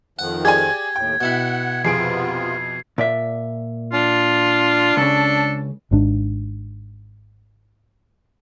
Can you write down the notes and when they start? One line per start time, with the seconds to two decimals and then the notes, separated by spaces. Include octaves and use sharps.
0.19 F2 D#3 F3 F#5
0.45 G4 G#4 D5 G#5 G#6
0.96 D#2 A2 G5
1.21 B2 E4 F#5 B5
1.84 F2 C3 B3 F4 G#4 C7 D7
2.98 A#2 D5 E5
3.93 D4 F4
4.97 C#2 C#3 A4
5.91 G#1 G#2 D4